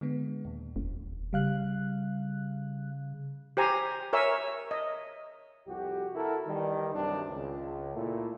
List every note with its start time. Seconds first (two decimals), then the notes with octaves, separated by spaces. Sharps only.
0.01 D3 G#3 B3
0.45 D#2 A#2
0.76 F1
1.33 C#3 G3 F5 F#6
3.57 G4 C5 G#5 A#5
4.13 A#4 C#5 E5 G#5 E6
4.71 D#5
5.67 C2 F2 F#4 G4
6.16 E4 F#4 A4 A#4
6.47 D#3 E3 G3
6.94 C2 G2 C3 F#3 G3 D4
7.28 C#2
7.95 A#2 A3 E4